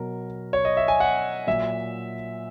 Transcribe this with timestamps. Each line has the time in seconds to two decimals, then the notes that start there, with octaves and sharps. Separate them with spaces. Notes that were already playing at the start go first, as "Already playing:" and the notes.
Already playing: B2 F#3 A#4
0.53 C#5
0.65 D#5
0.77 E5
0.88 G#5
1.00 F#5
1.47 A#2 F#3 E5